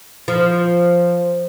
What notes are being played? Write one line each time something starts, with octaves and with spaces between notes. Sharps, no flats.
F3